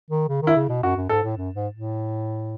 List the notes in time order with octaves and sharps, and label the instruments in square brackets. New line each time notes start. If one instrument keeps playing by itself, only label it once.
[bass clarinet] D#3
C#3
D#3
[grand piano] E4
[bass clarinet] C#3
B2
[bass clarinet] F#2 [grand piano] F#4
[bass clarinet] F#2
[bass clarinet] G#2 [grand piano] A4
[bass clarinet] A2
F#2
G#2
A2